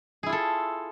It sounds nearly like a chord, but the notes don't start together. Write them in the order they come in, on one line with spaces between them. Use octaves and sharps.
G#4 E4 F4 A4